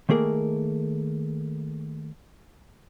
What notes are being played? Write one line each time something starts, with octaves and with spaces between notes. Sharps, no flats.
D#3 A3 A#3 G#4 A#4